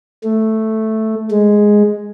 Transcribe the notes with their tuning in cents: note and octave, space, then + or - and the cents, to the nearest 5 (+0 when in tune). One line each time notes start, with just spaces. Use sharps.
A3 +0
G#3 +0